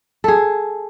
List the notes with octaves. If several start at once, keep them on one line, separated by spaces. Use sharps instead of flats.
G#4 A4